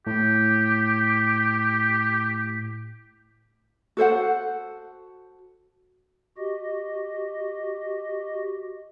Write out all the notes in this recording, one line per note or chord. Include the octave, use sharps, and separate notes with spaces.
A2 G4
F#4 A4 C5 F#5
F#4 G4 D#5